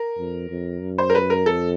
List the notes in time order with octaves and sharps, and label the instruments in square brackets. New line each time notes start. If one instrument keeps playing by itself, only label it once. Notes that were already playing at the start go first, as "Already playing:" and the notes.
Already playing: [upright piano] A#4
[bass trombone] F2
F2
F#2
[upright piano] C5
A#4
B4
A#4
[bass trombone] F2 [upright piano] A4